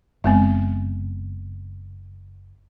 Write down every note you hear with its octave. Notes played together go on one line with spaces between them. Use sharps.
F#1 G#3 B3 C4